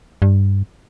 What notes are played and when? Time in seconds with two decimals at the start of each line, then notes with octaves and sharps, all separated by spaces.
0.22 G2